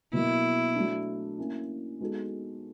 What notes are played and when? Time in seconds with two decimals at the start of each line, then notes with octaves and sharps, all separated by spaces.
0.13 B2 F#3 A#3 E4
0.75 F#3 A3 D4
1.39 A#3 C#4 E4
2.01 G#3 B3 D#4 F#4 A4